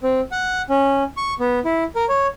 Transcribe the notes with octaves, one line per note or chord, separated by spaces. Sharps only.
C4
F#5
C#4
C#6
B3
E4
A#4
C#5